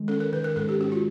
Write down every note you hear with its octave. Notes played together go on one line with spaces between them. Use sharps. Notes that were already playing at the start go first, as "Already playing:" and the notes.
Already playing: D#3 G#3
C#4 A4
A#4
D#3 B4
A#4
G#2 A4
G4
C#4 F#4
F4